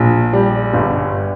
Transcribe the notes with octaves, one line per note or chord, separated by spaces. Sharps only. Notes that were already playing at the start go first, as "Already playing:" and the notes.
Already playing: A#1
G3
G1